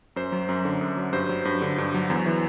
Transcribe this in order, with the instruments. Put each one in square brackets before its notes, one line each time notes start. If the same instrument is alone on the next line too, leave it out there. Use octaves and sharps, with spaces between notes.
[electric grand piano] F#2 C5
F#3
F#2
D3
F#2
F#3
G2 C5
F#3
G2
D3
G2
F#3
E2
E3